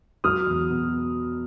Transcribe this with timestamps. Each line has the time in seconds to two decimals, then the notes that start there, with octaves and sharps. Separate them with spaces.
0.24 F#3 D#6 F6
0.47 E2
0.70 B2